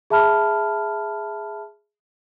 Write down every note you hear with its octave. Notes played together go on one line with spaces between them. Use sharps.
G#4 E5 A5 B5 F6